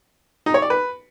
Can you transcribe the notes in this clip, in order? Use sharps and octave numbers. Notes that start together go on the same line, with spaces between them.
D#4
C#5
D5
B4